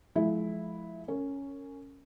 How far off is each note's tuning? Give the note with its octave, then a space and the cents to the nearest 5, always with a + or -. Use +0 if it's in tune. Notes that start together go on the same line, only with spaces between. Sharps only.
F3 +0 G#3 +40 E4 -5
C#4 +0 A#4 -30